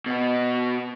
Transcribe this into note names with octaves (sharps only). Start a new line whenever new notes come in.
B2 B3